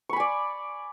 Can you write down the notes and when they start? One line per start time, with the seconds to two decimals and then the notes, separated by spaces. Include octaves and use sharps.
0.09 C#6
0.13 B5
0.16 G#5
0.20 D5